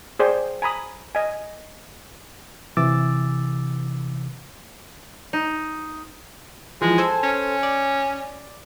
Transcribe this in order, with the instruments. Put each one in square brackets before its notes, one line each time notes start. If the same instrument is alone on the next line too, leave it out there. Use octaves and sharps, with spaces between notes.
[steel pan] G#4 C5 D5 G5
G#5 A#5 B5 D#6
D#5 G#5
[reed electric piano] C3 E3 D6 E6 A6
[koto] D#4
[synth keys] E3 F3 [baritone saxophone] G#3
[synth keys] A4 C5 G#5
[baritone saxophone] C#4
[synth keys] D5